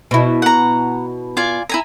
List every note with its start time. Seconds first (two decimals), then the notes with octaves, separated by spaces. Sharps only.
0.11 B2 E4
0.42 F#5 A#5
1.37 F4 D5 G#5
1.69 E4 G#5 A#5